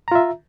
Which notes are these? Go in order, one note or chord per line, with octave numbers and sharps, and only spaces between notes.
F4 E5 A#5